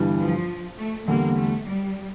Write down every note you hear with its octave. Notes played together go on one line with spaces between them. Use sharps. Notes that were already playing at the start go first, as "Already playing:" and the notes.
Already playing: G1 G2 E3 G3
F3
A3
E2 D3 G3 A#3
A3
G3